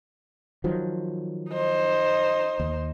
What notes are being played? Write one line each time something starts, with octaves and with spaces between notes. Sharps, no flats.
D#3 F3 F#3
D#4 C5
D#2